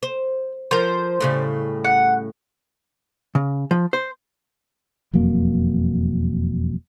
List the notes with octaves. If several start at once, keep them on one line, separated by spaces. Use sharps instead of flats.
C5
F3 A#4 C5
A2 C#3 G3
F#5
C#3
F3
C5
E1 F2 F#3 A#3